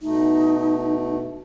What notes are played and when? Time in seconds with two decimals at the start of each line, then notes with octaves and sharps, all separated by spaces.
0.02 B2 A3 D#4